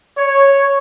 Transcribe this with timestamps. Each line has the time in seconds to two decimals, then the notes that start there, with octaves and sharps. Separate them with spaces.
0.17 C#5